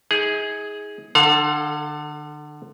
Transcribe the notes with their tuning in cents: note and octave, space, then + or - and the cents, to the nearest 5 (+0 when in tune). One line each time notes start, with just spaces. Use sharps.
D#4 +45 G#4 +0
D3 +30 A4 +0 F5 +40